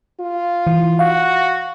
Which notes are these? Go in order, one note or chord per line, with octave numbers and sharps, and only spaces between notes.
F4
E3
F#4 F5